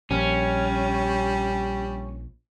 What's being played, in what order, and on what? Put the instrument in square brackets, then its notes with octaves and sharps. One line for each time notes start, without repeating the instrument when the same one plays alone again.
[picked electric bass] A#1 [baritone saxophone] G3 [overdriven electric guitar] C#4